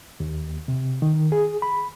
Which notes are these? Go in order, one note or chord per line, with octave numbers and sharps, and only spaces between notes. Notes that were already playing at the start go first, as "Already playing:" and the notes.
D#2
C3
D#3
G#4
B5